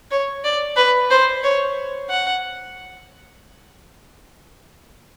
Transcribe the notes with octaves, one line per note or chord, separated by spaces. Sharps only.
C#5
D5
B4
C5
C#5
F#5